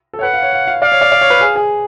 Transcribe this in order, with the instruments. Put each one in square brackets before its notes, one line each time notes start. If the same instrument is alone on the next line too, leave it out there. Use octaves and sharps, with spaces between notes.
[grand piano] A4
C#5
[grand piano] B4 [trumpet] F#5
[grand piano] F5
C#5
F5
F5
[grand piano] D5 [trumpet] F5
[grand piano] C#5
D5
D5
C#5
B4
G#4
G#4